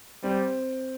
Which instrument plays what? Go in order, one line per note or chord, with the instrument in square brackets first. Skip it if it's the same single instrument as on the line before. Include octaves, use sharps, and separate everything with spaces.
[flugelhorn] G3 [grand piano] C4